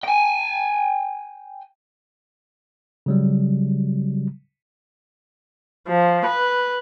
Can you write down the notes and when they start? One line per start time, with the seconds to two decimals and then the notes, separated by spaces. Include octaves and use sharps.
0.04 G5 G#5
3.06 C#3 F#3 G3
5.90 F3
6.28 B4